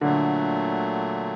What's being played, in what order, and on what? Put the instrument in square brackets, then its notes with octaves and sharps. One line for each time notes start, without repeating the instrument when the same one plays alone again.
[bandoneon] A#2 F#3 A3 [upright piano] D3